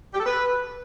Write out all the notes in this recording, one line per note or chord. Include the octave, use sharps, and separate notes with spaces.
G4
A4
B4